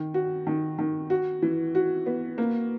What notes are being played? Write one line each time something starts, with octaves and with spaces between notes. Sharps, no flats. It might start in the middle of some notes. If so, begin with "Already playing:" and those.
Already playing: D#3
F#4
D#3
D#3
F#4
E3
F#4
B3
A#3